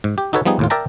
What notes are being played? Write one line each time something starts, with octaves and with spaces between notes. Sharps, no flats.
G#2
G4
D#4 F#4 A4 B4 C#5
F3 G3 B3 D#4 G#4
D#2 A2 F4
A#4 D5 E5 G5 A5 A#5